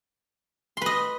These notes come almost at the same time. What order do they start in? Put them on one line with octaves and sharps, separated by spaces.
C6 B4 D#5